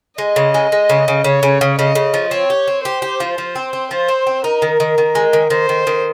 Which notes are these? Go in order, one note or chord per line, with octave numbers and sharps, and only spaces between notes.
G#3 D#5
C#3
G#3
G#3
C#3
C#3
C#3 C#5
C#3
C#3
C#3 D#5
C#3
F3
C4 C#5
G4
C4
G4 C5
G4
F3
F3
C4
C4
F3 C5
C4
C4
D#4 A#4
D#3
D#3
D#3
G#3
D#3
D#3 C5
D#3
D#3